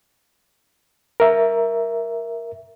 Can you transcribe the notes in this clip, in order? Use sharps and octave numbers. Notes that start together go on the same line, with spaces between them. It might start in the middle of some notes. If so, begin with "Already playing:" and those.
A#4 E5